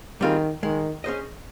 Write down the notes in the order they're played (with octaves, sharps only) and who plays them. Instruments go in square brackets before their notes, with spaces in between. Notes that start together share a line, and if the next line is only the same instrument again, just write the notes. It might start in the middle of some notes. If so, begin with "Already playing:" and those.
[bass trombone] D#3 [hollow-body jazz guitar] G3 C4 F4 G#4
[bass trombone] D#3 [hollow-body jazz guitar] G#3
[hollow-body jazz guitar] C#4 G#4 C5 D#5